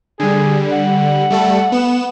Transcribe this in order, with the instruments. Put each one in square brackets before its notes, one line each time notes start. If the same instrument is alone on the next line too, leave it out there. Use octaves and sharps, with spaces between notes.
[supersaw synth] D3 G3 [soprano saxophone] G#4
[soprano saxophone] F#5
[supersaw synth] G3 A3 A4
B3 E7